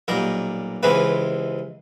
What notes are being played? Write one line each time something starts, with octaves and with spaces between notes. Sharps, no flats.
B1 A#2 G3 A#4
C#2 C3 E3 G#3 B4